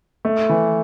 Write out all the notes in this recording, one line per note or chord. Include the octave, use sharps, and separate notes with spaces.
A3
E3